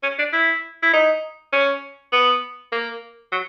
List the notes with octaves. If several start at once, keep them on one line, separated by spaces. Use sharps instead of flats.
C#4
D4
E4
E4
D#4
C#4
B3
A#3
F#3